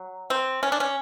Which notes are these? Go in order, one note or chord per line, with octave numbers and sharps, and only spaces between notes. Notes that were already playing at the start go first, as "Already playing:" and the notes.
Already playing: F#3
C4
C#4
D4
C#4